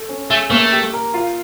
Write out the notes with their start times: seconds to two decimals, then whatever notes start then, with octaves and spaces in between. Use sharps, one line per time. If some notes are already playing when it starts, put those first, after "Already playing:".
Already playing: A4
0.09 C#4
0.30 A3 G#4
0.50 A3 A#3
0.72 G4
0.93 A#4
1.14 F4